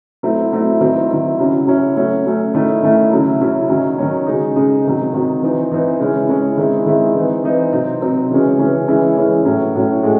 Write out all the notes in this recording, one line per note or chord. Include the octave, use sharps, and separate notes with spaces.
F#3 A3 C4 E4
F#3 A3 C4 E4
D#3 F#3 C4 E4
D#3 F#3 C4 E4
C#3 F#3 C#4 E4
C#3 F#3 C#4 E4
F#3 A3 C#4
F#3 A3 C#4
D#3 A3 C#4 E4
D#3 A3 C#4 E4
C#3 F#3 C#4 E4
C#3 F#3 C#4 E4
D#3 F#3 C#4
D#3 F#3 C#4
C#3 G#3 D#4
C#3 G#3 D#4
C3 D#3 F#3
C3 D#3 F#3
E3 C4 D#4
E3 C4 D#4
C#3 G#3 C#4 E4
C#3 G#3 C#4 E4
D#3 G#3 C4 E4
D#3 G#3 C4 E4
E3 C4 D#4
E3 C4 D#4
C3 F#3 C4 D#4
C3 F#3 C4 D#4
C#3 E3 G#3 C#4
C#3 E3 G#3 C#4
E3 G#3 C#4 E4
E3 G#3 C#4 E4
A2 F#3 C#4
A2 F#3 C#4
A2 G#3